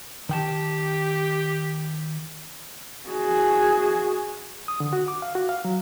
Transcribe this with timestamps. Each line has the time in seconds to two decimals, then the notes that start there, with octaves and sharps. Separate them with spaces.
0.29 D#3 G4 G5 A5
3.09 F#4 G#4
4.68 D#6
4.80 D3
4.93 F#4
5.08 D6
5.22 F5
5.35 F#4
5.49 F5
5.65 F#3